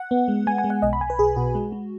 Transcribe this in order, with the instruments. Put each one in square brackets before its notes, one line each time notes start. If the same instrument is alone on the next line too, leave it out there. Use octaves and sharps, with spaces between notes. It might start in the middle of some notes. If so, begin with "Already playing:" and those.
Already playing: [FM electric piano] F#5
B3
G#3
G#3 G#5
G#5
G#3
F#5
B1 D#5
B5
B1 G#5
B4
B1 G#4
B2 F#4
G#3
G#3